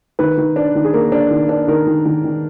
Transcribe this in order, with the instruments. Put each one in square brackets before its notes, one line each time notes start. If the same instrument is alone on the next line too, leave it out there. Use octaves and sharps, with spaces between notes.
[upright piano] D#3 B4
D#3
D4
D#3
G#4
A#3 A#4
D4
D#3
D4
D#3 A#4
D#3
D#3
D#3